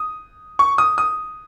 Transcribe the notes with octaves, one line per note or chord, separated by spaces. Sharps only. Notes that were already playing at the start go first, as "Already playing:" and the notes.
Already playing: D#6
C#6
D#6
D#6